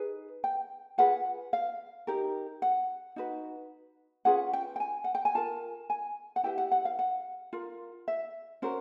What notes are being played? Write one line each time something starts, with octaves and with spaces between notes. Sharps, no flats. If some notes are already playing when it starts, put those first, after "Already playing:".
Already playing: D#4 G#4 B4
G5
F4 G#4 B4 F#5
F5
D#4 G4 A#4
F#5
D#4 F#4 B4
C#4 F4 G#4 B4 F#5
G5
G5
G#5
F#5
G5
G#5
F4 A#4 A5
G#5
F#5
E4 G4 B4 G5
F#5
F#5
F5
F#5
F4 A#4
E5
C#4 F#4 A#4 C5